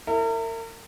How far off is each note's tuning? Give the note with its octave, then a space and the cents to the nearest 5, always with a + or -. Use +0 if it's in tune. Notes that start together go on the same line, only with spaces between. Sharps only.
E4 +0 A#4 -40